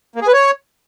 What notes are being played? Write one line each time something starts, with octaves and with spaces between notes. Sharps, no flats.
A#3
G#4
B4
C#5